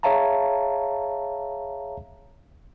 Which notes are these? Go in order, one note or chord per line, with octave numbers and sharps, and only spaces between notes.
G#4 C#5 E5 F5 A5 A#5